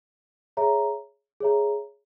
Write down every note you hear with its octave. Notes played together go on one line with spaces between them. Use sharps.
G#4 C#5 E5 A#5
G#4 C#5 E5 A#5